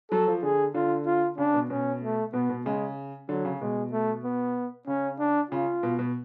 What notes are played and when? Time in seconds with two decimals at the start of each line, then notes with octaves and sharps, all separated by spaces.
0.11 F#3 A4
0.28 F3
0.43 D3 G#4
0.74 D3 F4
1.06 F4
1.38 C#3 D4
1.54 B2
1.70 B2 C#4
2.02 A3
2.33 B2 B3
2.49 B2
2.66 C#3 G#3
3.29 D3 F#3
3.45 C#3
3.61 B2 G#3
3.92 A3
4.24 B3
4.87 C#3 C#4
5.19 D4
5.51 C#3 F4
5.83 B2
5.99 B2